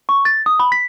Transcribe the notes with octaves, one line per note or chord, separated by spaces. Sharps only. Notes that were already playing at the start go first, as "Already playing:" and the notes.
C#6
A6
D#6
B5
B6